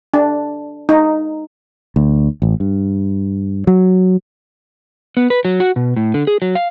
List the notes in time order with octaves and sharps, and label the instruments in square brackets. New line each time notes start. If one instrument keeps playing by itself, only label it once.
[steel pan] D4
D#4
[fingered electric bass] D2
A1
G2
F#3
[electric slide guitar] B3
B4
F#3
F#4
B2
A2
D3
G#4
F#3
F5